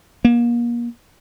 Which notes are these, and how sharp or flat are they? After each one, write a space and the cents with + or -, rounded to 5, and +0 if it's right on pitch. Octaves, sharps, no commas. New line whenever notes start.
A#3 +35